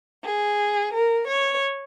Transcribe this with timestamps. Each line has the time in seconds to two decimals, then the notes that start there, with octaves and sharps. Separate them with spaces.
0.24 G#4
0.93 A#4
1.28 C#5